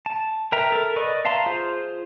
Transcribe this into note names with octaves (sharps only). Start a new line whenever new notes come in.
A5
A#4 B4 E5 G5 A#5
A4 A#4
B4 D5 D#5 B5 C#6
E5 F5 A5 A#5 C6
F4 G#4 C5